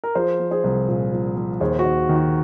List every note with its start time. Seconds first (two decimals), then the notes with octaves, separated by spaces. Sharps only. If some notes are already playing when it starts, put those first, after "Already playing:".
0.04 A#4
0.15 F3 G#4 C5
0.39 F3
0.51 G#4 C5
0.64 C2
0.88 A#2
1.12 F3
1.36 F3
1.60 D#2 G#4 C5
1.79 F#4
1.85 D#2
2.09 D#3
2.16 F#4